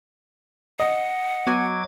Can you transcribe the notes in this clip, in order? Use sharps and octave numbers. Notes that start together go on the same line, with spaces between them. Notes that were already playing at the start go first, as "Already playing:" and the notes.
D#5 F#5
F#3 B3 F#4 G#5 D6 G#6